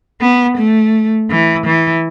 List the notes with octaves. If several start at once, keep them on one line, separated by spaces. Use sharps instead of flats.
B3
A3
E3
E3